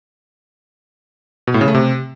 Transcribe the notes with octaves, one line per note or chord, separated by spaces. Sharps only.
B2
A2
C#3
A3
C3